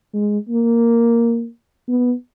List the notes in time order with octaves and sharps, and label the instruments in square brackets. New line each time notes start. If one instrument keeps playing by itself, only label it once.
[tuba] G#3
A#3
B3